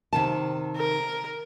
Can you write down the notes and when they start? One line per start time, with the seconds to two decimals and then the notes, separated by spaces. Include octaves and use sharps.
0.13 C3 D#3 A5
0.77 A#4